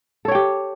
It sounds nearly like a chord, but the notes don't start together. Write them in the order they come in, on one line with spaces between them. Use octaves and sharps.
A4 C#5 G5 G4